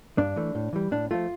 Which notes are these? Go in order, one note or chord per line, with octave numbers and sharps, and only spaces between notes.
G2 D4
E3 A3
A2
E3 G3
A2 D4
F3 A3 F4